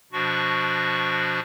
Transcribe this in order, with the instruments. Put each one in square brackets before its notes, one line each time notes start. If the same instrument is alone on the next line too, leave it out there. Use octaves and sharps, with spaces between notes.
[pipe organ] B2 F3 D4 F#4 C#6